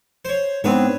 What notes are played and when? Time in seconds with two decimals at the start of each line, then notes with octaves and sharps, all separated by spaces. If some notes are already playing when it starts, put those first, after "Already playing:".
0.25 C5 C#5
0.64 G#2 B3 C4 D4 B4 C#5